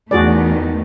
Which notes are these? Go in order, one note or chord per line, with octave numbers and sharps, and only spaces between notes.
E2 D#3 A3 F#4 G#4 D5